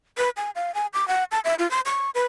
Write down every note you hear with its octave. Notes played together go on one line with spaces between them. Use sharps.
B4
G#5
F5
G#5
D6
F#5
A5
E5
F4
C6
C#6
B4